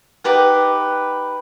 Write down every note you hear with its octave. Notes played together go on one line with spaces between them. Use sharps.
D#4 G4 B4 F#5